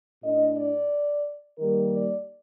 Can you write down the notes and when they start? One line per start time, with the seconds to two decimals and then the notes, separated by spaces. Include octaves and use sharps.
0.22 A2 A3 D4 D#5
0.56 D5
1.58 D#3 G3 A#3 A#4
1.93 D5